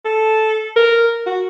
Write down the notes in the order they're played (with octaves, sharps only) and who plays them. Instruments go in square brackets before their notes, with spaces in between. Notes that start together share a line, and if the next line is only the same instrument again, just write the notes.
[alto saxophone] A4
A#4
F#4